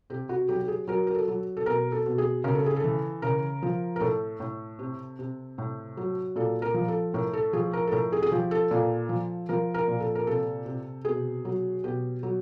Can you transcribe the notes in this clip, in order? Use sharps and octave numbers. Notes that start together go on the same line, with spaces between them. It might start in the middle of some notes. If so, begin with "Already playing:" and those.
C3 G4
F#4
F#3 G4
G4
G#4
F#3 A#4
A#4
A4
F#3
A4
B2 A#4
A4
B2
G#4
C#3 A#4
A4
G#4
A4
E3
C#3 A#4
F3
A#4
A2 A4
A2
C3
C3
A2
F#3
A#2 A4
A#4
F3
A4
A2 A#4
A4
F3 G#4
A#4
A4
A2 A#4
G#4
G#4
F3 G4
A4
A#2 A4
F3
F3 A#4
A#4
A#2
A4
A#4
C3 A4
C3
B2 G#4
F#3
B2 G4
F#3